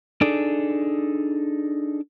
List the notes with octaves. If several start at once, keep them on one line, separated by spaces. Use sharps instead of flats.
D4 D#4 G#4 A4 D5